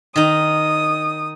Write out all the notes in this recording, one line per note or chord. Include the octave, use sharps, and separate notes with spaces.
D#3 D#4 D#6